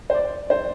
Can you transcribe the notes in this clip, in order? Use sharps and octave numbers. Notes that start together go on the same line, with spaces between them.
C5
D5
C5